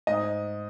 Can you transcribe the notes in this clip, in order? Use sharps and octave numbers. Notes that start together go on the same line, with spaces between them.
G#2 D#5